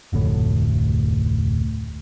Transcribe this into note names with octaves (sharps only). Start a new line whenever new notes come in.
F1 D2 A2